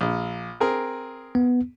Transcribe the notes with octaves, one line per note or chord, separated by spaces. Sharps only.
A#1
C4 G#4 A#4
B3